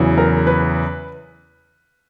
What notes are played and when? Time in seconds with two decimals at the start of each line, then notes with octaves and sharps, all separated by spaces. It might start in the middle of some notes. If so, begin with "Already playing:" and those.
Already playing: E2 C#3 F#3
0.18 A#4
0.47 B4